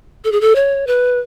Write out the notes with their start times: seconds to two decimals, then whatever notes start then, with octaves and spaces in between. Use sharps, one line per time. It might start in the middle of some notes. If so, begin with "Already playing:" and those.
0.24 A4
0.32 G#4
0.41 A4
0.55 C#5
0.87 B4